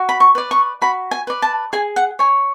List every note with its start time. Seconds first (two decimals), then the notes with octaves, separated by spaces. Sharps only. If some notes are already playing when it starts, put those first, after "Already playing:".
Already playing: F#4
0.09 B5
0.20 C#6
0.35 B4 D5
0.51 C#6
0.81 F#4 B5
1.11 G#5
1.27 B4 D5
1.42 A5
1.73 G#4 G#5
1.96 F#5
2.19 C#5 G#5